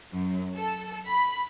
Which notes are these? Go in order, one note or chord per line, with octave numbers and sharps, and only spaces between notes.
F#2
A4
B5